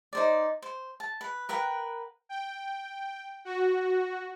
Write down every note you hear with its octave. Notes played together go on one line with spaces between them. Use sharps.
D#4 C5 D5
C5
A5
B4
A#4 B4 F#5 G5
G5
F#4